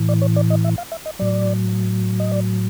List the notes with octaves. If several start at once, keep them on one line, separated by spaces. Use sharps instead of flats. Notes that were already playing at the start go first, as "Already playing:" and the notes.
Already playing: A2 E3
D5
C#5
D5
D#5
E5
F5
E5
D#5
A2 F#3 D5
D#5
D5